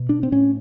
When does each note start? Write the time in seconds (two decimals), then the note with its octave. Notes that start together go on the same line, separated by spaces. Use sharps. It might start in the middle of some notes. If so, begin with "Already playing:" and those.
Already playing: B2
0.09 D4
0.23 C4
0.32 A2 C#4